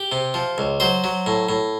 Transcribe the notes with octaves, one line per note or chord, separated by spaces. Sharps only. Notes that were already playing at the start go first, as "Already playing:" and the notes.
Already playing: G4
C3
F3
C#2
F#3 C5
F#3
A2
A2